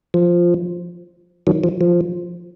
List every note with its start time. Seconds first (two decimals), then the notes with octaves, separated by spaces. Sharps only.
0.14 F3
1.47 D#3 F#3
1.64 F3
1.81 F3